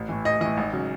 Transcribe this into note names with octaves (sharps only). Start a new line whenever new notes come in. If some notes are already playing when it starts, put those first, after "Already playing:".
Already playing: A1
A2 E3
A1 D#5
A2 E3 D#5
G#1
C#3 F#3